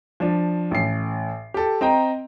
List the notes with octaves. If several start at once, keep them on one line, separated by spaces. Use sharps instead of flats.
F3 D4
A1 C7
G4 A4
C4 D#5 G5 A#5